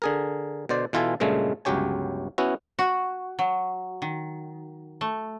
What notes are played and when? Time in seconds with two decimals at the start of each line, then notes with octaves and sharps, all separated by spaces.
0.02 D3 G#4 A#4
0.69 B2 D3 C5 D5
0.93 B2 E3 F4 A4 G#5
1.20 G2 A#2 C#3 G#3 A3
1.65 G1 C#2 F#3 G4 C#5 G#5
2.38 B3 C#4 E4 F#4
2.79 F#4
3.39 F#3
4.02 D#3
5.01 A3